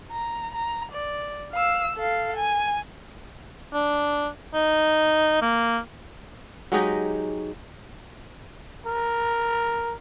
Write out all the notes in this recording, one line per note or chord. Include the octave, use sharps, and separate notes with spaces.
A#5
A#5
D5
F5 E6
A4 F5
G#5
D4
D#4
A#3
F#3 G#3 D#4 G4
A#4